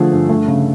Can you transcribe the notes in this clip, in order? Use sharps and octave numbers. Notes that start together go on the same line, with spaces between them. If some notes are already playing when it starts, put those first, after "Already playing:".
Already playing: D3 F3 A3 G#4
G2
A3
C#3